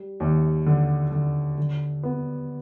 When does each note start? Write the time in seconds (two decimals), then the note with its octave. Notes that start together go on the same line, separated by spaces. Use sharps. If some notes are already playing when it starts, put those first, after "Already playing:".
Already playing: G3
0.20 D#2
0.66 D3
1.12 D3
1.58 D3
2.03 B3